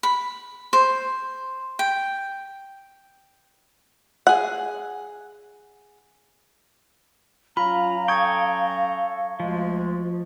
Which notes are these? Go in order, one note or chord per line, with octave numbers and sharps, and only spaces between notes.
B5
C5
G5
G#4 F#5
F#3 C#4 F4 F5 A#5 B5
A4 G5 C#6 D#6 G#6
D2 F3 G#3